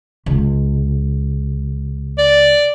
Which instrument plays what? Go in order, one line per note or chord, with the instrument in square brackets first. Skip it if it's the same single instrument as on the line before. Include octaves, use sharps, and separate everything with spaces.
[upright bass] C#2
[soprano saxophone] D5